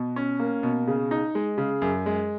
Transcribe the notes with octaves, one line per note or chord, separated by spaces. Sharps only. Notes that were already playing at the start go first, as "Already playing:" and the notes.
Already playing: B2
C#4
A#3
B2
C#3
D#4
G#3
C#3
F#2
G#3